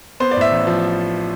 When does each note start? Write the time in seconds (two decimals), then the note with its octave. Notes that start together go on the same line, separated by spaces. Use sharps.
0.20 B3 C5
0.31 D5
0.37 A2 E5
0.52 A1
0.67 F3